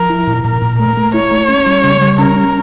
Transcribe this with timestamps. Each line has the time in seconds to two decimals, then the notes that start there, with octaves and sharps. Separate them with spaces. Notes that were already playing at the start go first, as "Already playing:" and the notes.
Already playing: F3 A#4
0.10 E4
0.27 A#2
0.44 A#2 A#4
0.62 A#2
0.79 A3 A#4
0.97 A3
1.14 E4 C#5
1.31 A3
1.49 C#4
1.66 G3
1.84 C#3
2.01 G3
2.18 C#4 A#4
2.36 C#4